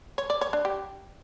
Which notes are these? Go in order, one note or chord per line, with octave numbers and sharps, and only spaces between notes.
C#5
D5
C#5
D4
G4